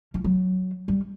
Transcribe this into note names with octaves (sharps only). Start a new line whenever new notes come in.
F3
F#3
G3